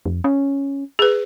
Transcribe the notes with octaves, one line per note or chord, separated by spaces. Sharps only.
F2
C#4
G#4 B4